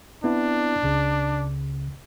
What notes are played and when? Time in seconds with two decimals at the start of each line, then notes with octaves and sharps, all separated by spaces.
0.24 B3 C4 D4 E4
0.83 C#2 C#3